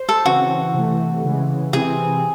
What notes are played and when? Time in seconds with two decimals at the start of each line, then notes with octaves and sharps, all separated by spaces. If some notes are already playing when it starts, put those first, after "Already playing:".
Already playing: C5
0.09 A4
0.25 C#3 E3 C4 F#4
0.74 C3 E3 A3
1.24 C#3 E3 G#3
1.73 C3 E3 C4 E4 G#4